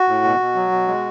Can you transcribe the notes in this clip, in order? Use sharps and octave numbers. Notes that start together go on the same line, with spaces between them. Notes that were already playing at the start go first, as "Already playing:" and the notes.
Already playing: F#4
A2
B2
B2
F#3
B2
G#3